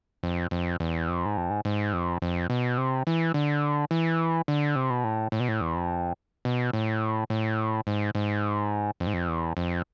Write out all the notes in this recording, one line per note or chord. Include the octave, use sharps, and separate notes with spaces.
F2
F2
E2
F2
G#2
F2
G#2
G#2
F2
F2
B2
C3
E3
D3
E3
D3
C3
B2
A2
A2
B2
A2
E2
F2
B2
A2
A2
G#2
G#2
F2
G#2
F2
E2
F2